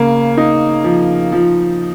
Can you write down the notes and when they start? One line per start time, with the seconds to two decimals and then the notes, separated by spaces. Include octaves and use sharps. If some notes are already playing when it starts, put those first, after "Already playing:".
Already playing: C#3 A#3
0.37 D#4
0.84 F3
1.32 F3